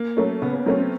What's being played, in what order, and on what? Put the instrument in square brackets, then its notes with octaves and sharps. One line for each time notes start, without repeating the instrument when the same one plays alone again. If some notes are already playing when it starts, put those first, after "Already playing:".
Already playing: [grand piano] A#3
[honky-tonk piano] F#3 A3 C#4
[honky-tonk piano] C#3 [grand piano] B3
[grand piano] B3
[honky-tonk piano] F#3 A3 C#4 [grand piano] C4
[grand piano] C4